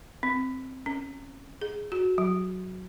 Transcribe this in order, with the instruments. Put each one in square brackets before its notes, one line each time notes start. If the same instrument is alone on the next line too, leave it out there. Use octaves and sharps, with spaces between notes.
[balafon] C4
C#4
G#4
F#4
F#3